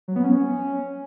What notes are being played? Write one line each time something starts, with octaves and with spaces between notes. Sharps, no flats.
F#3
B3
C#4